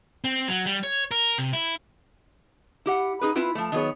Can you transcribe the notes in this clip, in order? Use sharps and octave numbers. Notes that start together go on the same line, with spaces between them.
C4
F#3
G3
C#5
A#4
C3
E4
E4 G4 F#5
D#4 G#4 B4
C4 E4 F4 B4
F3 A3
D#3 F#3 B3 G#4 C#5